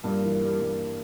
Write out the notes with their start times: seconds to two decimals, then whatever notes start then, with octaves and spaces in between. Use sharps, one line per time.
0.04 G2 A#2
0.23 E3
0.42 G3
0.60 G2